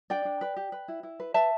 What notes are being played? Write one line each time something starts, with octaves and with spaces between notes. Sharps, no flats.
D4 D5 G5
D4
B4
G4
B4
E4
E4
B4
B4 E5 A5